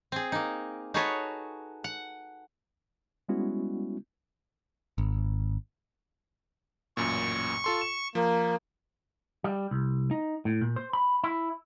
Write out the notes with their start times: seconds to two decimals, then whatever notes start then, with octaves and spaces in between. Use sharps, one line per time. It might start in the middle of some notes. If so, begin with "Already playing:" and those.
0.12 C4 G#4
0.32 A#3 D#4
0.94 D#4 F#4 G#4 A4 B4 C#5
1.84 F#5
3.29 G3 G#3 B3 C#4 E4 F#4
4.98 G#1
6.97 A1 F#2 A#2 C#6
7.64 F4 A4 C6
7.81 E7
8.15 F3 A#3
9.44 G3
9.71 C2
10.11 D#4
10.45 A2
10.61 A#2
10.76 C5
10.93 B5
11.24 E4